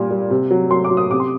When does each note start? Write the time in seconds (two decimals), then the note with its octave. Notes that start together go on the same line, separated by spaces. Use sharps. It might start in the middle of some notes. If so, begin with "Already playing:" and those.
Already playing: A#2 G3
0.11 G3
0.30 C3
0.51 F#3
0.71 F#3 C6
0.84 D6
0.91 F#3
0.97 D#6
1.11 C3 D6
1.20 C6